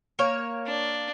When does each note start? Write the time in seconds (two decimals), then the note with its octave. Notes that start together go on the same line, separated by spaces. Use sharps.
0.19 A#3 C#5
0.66 D4